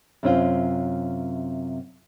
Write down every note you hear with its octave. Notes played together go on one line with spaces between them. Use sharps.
F#2 C3 C4 C#4 E4 F4